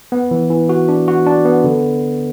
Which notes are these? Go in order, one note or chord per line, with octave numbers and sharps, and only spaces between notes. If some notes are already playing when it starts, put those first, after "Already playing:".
B3
E3
E3
F#4
D4
F#4
D4
B3
D3